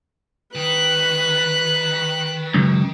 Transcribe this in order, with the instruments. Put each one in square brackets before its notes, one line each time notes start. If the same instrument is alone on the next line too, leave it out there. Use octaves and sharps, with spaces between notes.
[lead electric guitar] D#3 [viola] B4 [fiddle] F#6
[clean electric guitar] C#2 F#2